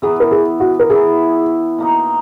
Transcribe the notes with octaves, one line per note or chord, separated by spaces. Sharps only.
E3 B3 E4 G#4
A#4
G#4
F#4
A#4
E3 B3 E4 G#4
B2 A#3 D#4